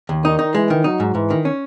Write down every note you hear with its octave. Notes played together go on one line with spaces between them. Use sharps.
D#2
D#3 D#4
D#4
E3 G#3
D#3
F#3 D#4
G#2
G#2 E3
D#3
C#4